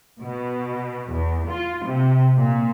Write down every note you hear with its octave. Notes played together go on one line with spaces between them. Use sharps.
B2
E2
F4
C3
A#2